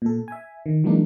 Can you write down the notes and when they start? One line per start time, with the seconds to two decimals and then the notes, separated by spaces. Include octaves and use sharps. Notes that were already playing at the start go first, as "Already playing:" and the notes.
0.02 A#2 A4
0.28 E5 G#5
0.66 D#3
0.84 E3 F#3 G#3 A#3 D4 D#4